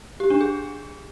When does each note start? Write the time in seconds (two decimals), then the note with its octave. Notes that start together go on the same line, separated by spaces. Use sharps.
0.20 G4
0.30 D4
0.41 G#4